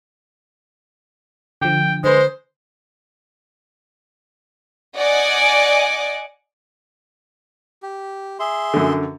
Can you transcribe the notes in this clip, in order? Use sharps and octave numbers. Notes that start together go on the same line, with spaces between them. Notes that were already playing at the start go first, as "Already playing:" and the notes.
D3 F3 G5
D3 G#3 B4 C5
D5 D#5 F#5 G#5 D6
G4
G#4 E5 C6
F#2 D3